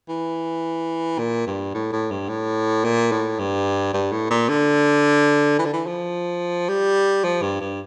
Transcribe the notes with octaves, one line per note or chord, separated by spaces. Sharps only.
E3
A#2
G2
A2
A2
G2
A2
A#2
A2
G2
G2
A2
A#2
D3
E3
D3
E3
F3
G3
F3
G2
G2